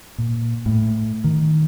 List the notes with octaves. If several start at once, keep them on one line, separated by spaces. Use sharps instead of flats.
A#2
A2
D#3